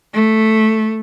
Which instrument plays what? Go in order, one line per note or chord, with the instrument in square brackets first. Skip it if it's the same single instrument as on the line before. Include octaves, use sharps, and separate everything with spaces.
[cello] A3